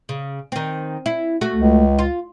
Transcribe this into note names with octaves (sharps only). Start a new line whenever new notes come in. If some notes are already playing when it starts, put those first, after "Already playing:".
C#3
D#3 C4
E4
A3 F#4
C#2
F4